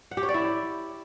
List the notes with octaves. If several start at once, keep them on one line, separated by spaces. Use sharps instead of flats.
F#5
G4
C#5
D5
E4